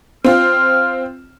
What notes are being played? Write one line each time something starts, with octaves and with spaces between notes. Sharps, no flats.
C4 F4 F6